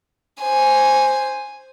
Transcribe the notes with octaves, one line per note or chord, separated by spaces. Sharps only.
C5 G#5